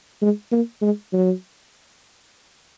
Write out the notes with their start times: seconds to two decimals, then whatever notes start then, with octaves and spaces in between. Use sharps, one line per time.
0.22 G#3
0.52 A#3
0.81 G#3
1.13 F#3